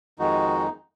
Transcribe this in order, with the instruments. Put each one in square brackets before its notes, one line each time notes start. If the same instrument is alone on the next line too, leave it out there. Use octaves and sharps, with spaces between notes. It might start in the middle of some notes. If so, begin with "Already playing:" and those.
[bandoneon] F2 D#3 G#3 D#4 F#4